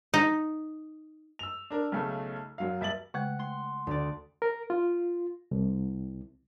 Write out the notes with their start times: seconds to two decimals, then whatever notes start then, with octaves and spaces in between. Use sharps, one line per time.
0.14 D#4
1.39 E6 F7
1.70 D4 A#4
1.92 B1 C#3 A3
2.58 F#2 F#3 F5
2.81 D#1 E5 A6 F#7
3.14 C#3 G#3 A3 F#5
3.39 A3 C6
3.87 D2 D5
4.42 A#4
4.70 F4
5.51 C2